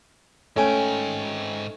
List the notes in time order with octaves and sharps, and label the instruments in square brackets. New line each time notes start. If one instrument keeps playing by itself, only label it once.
[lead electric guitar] G#2 G5 [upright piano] A3 [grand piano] C#4 G#5